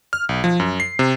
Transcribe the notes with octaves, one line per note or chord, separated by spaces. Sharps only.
F6
B1
F3
F#2
C7
C3